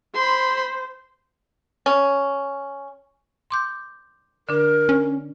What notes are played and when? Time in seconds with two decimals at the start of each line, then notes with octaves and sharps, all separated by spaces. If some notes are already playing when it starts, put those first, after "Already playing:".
0.15 C5 B5 C6
1.86 C#4
3.51 C6 D6 G6
4.49 D3 D4 A#4
4.89 C#4